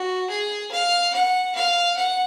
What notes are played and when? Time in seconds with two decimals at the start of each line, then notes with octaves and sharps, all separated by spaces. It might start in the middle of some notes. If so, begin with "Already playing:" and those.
Already playing: F#4
0.30 G#4
0.72 F5
1.13 F#5
1.55 F5
1.97 F#5